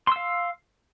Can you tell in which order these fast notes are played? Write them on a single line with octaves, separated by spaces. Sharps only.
C6 E6 F5